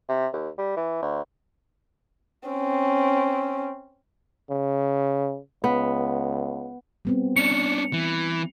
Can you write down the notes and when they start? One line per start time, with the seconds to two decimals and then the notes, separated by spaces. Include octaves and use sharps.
0.09 C3
0.33 D#2
0.58 G3
0.77 E3
1.02 D2
2.49 C4 C#4
4.50 C#3
5.64 C#2 B3
7.05 G3 B3 C4
7.36 C#4 D4 C#7
7.93 E3